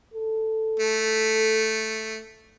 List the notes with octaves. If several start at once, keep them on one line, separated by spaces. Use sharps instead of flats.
A4
A3